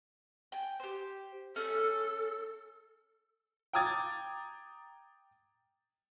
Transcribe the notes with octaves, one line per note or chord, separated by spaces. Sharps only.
G5 G#5
G4 C5
C#4 G#4 A4
G5 A#5 D6 D#6 G#6 A6